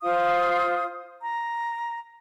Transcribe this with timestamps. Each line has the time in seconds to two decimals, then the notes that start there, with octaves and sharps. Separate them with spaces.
0.03 F4 C5 F5 D#6
1.22 A#5